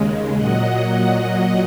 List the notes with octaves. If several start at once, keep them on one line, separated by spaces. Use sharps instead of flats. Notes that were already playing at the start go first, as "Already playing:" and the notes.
Already playing: D#2 C#3 G#3
A#2 F#3 D#5 F#5